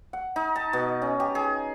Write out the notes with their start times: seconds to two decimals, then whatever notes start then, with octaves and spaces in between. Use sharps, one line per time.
0.13 F#5
0.36 D#4
0.56 A5
0.73 B2
1.02 C#4
1.20 G4
1.35 G#4